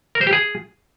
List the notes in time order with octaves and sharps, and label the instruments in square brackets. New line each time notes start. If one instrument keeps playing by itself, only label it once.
[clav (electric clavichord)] A#4
C5
G4
G#4